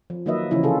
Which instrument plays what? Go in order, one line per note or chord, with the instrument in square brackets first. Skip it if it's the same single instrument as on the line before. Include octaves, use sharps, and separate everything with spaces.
[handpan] F3
D#3 F#3 A#3 B4 D#5 E5
C#3 E3 F3 C#4 E4
C3 C#4 F4 G#4 A4